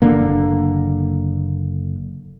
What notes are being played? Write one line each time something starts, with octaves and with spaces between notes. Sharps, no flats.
F#1 D3 A#3